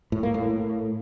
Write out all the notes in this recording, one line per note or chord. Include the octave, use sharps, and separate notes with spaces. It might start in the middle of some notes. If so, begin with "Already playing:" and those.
A2
A#3
A2